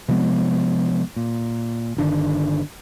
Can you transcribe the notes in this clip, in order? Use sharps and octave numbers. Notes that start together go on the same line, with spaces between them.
C3 F3 G#3 B3
A#2
G1 D3 D#3